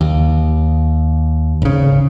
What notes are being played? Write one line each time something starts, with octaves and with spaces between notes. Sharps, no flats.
D#2
G#1 C#3